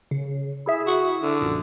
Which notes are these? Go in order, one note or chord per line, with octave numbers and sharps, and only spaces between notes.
C#3
E4 G#4 E5
F#4
D3
A#1 F#2 A#2